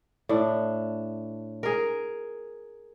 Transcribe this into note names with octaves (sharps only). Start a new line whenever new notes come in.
A2 D4
G#4 A#4